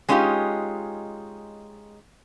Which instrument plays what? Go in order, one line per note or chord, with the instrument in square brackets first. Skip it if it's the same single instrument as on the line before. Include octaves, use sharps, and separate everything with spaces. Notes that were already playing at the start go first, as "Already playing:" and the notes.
[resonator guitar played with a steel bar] G#3 C#4 D#4 F4 G4